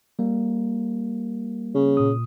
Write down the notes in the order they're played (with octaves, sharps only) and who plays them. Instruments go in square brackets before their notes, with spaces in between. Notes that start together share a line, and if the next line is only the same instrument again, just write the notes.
[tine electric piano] G3 A#3
[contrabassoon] C#3
[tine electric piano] A#2 D#6